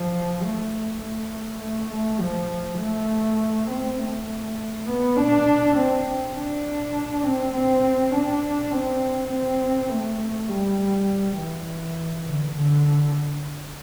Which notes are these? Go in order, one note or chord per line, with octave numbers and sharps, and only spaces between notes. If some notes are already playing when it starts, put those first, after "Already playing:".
Already playing: F3
A3
A3
A3
A3
F3
A3
C4
A3
B3
D4
C4
D4
C4
C4
D4
C4
C4
A3
G3
E3
D3
D3